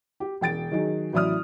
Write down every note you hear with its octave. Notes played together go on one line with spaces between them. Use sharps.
G4
E1 G5 A6 D7
D#3 F#3 D#4 G#4
A1 F#3 E4 D5 D#6 F6